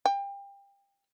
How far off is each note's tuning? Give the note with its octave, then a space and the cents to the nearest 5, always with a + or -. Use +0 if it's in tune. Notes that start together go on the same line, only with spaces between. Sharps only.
G5 +30